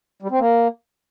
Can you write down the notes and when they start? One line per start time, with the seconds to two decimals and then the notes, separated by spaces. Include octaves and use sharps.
0.22 G3
0.31 C4
0.40 A#3